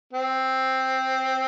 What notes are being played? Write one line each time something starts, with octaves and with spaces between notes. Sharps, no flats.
C4